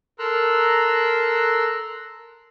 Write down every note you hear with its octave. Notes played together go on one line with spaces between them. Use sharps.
A4 A#4 A#5 C6 E6 F#6